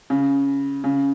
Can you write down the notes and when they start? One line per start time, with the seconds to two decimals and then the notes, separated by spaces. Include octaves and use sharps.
0.10 C#3
0.84 C#3